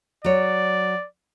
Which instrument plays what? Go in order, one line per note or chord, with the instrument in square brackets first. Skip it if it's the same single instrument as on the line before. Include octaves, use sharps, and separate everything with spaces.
[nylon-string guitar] F#3 C#5 [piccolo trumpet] D5